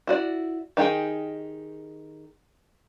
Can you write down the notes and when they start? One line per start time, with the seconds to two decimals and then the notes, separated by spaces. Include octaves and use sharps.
0.07 E4 F#4 D5
0.77 D#3 D#4 G4 G#4 G5